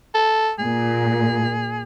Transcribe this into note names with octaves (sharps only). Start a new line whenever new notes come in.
A4
A#2 G#4